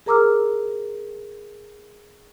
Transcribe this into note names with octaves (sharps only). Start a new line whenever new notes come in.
G#4 A#4 A#5 D6 E6 F6